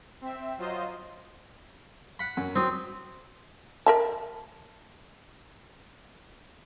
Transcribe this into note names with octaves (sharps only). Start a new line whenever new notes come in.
C4 E5
F#3 F4 C5 D#5 C6
F#5 B5
F#2
F#3 C4 D#6
A#4 E5 A5